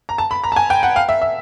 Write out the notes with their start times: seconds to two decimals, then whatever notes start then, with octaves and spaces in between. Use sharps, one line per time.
0.09 A#5
0.18 A5
0.31 B5
0.44 A#5
0.52 A5
0.56 G#5
0.70 G5
0.83 F#5
0.96 F5
1.09 E5
1.22 E5